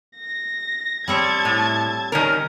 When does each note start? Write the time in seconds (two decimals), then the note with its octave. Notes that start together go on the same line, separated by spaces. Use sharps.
0.18 A#6
1.08 G3 C4 C#5 A5 G#6
1.45 A2
2.12 D#3 C#4 A#4